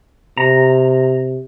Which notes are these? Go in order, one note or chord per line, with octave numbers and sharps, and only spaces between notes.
C3 A#5